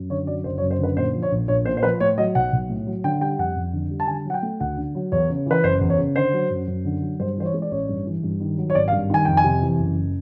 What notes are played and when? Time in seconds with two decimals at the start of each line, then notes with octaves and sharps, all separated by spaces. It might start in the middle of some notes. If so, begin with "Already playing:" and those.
Already playing: F#2
0.10 D3 C#5
0.27 F#3 D5
0.44 F#1 C5
0.58 C#5
0.62 F#2
0.71 C5
0.79 D3 B4
0.97 A#2 C5
1.14 F3
1.22 C#5
1.31 A#1
1.48 A#1 C#5
1.65 A#2 C5
1.77 C5
1.83 F3 B4
2.00 A2 C#5
2.18 F#3 D#5
2.35 B1 F#5
2.52 B1
2.69 A2
2.87 F#3
3.04 D3 G5
3.21 G3 G5
3.39 F2 F#5
3.56 F2
3.73 D3
3.91 G3
4.00 A5
4.08 D3 G#5
4.25 F#3 F#5
4.34 G5
4.43 A3
4.60 D2 F#5
4.77 D3
4.95 F#3
5.12 E2 C#5
5.29 C#3
5.46 E3 B4
5.63 F#1 C5
5.81 E2
5.90 C#5
5.98 C#3
6.16 D3 C5
6.33 F#3
6.50 F#2
6.68 F#2
6.85 D3
7.02 F#3
7.20 G2 C5
7.37 E3 C5
7.45 C#5
7.54 G#3
7.62 D5
7.71 A1 C#5
7.89 G2
8.06 E3
8.23 G2
8.40 D#3
8.58 F#3
8.70 C#5
8.75 G#1 D5
8.88 F5
8.92 G2
9.10 D#3 G#5
9.25 F2 G5
9.37 G#5
9.44 C3
9.62 E3
9.79 F#1